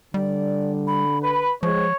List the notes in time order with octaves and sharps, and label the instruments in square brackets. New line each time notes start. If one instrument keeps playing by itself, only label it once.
[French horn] D3 [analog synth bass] G3 [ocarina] D5
[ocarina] B5
[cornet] B4 [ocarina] B5
[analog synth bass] F3 [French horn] G#3 [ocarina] C5 [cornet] C#5